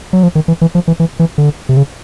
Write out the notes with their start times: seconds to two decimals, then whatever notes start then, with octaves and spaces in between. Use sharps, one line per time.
0.13 F#3
0.23 F3
0.35 D#3
0.48 E3
0.61 E3
0.75 F3
0.88 E3
1.00 E3
1.19 E3
1.38 D3
1.69 C3
1.77 C#3